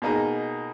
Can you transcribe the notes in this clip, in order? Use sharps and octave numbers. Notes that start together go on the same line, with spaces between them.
B2 A#3 D#4 G#4